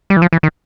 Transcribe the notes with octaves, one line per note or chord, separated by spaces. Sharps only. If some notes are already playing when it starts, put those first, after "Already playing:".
G3
E3
F3
E3
D#3